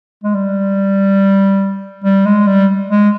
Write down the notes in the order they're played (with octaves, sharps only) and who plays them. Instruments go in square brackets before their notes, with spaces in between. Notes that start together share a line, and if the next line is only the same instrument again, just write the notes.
[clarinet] G#3
G3
G3
G#3
G3
G#3